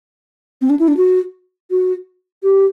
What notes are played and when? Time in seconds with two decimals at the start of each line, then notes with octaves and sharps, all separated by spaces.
0.61 C4
0.70 D4
0.79 E4
0.88 D4
0.97 F#4
1.71 F#4
2.43 G4